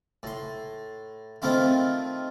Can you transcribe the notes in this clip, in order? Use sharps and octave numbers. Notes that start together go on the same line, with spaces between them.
A2 C6
D#3 A3 C4 E4 F4